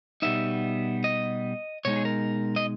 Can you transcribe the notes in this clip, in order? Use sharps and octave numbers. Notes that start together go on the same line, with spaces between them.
B2 G3 B3 D#4 E5
D#5
B2 G#3 D#4 C#5
G#4
A#4
D#5